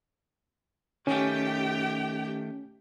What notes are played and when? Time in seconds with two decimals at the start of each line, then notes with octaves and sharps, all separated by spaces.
1.07 D#3 A3 C#4 G4 G5